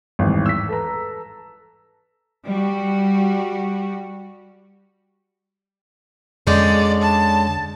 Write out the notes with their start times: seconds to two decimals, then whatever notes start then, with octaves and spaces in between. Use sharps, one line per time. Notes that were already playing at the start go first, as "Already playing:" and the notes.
0.19 G#1 E2 A2 E3 G3
0.46 E6 B6
0.69 A4 B4 A#5
2.46 G3 F#4
6.47 F2 D3 G#3 C#4 D5 G6
7.02 A5